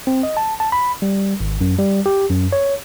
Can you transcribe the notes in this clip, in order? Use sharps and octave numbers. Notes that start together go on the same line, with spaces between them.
C4
D#5
A5
A5
B5
G3
G#1
F#2
G3
G4
F#2
C#5